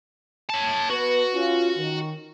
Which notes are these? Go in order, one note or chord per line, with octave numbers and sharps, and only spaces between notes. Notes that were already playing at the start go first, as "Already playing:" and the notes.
C#5 A5
B3 F#4 B4
C#4 F4
D#3